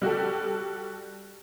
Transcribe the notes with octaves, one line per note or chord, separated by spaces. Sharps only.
G3 F#4 G4 A4